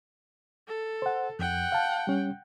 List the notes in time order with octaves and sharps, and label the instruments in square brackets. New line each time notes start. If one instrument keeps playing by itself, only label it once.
[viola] A4
[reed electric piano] C5 F#5
[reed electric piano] F2 [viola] F#5 G5
[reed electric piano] F5 A5
G3 C#4